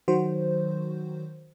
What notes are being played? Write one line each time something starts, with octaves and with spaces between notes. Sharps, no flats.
D#3 F#3 F#4 C5